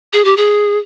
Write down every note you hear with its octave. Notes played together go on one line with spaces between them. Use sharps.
G#4
G4
G#4